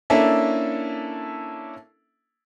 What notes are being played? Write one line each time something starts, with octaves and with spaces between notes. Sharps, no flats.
A#3 C#4 D4 E4 A4 E5